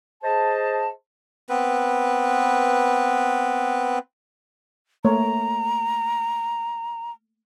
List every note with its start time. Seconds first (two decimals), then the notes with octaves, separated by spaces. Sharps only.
0.22 G#4 C5 D#5 A5
1.49 B3 C4 B4
5.05 A3 A#3 C#5 A#5